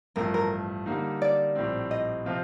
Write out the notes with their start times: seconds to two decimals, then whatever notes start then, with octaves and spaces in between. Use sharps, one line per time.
0.16 A1 G2 F3 A3 A#4
0.34 A#4
0.86 D3 G3 A#3 D#4
1.22 D5
1.55 A#1 A2 G3 C4
1.91 D#5
2.26 C3 F3 C4 F4